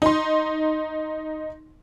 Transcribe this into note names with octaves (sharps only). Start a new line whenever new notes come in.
D#4 C6